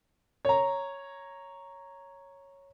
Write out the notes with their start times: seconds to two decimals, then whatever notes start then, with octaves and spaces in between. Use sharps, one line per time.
0.45 C#5 A#5